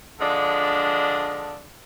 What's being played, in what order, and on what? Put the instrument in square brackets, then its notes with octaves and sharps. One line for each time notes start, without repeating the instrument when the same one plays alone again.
[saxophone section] D3 F3 G#3 D4